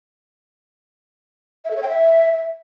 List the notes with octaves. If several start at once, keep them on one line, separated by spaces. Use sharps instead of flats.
E5
A4
C#5
G5
E5